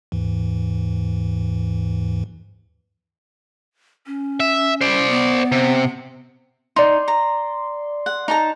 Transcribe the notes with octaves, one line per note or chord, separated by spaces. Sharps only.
D#2 G#2 E3
C#4
E5
C5 D5
B3
C3
D#4 D5 C6
A#5
F#5
D#4 A5 A#5